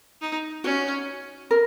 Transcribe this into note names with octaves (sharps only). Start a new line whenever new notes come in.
D#4
C#4 F#4
A#4